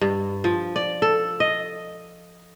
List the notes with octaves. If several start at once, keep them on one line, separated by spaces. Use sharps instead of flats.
G2
F3
D5
A4
D#5